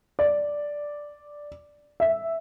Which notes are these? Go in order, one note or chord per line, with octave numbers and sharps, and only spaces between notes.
D5
E5